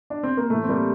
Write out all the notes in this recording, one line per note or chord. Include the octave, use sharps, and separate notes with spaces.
D4
C4
A#3
A2 E3 A3
C4
G3 A#3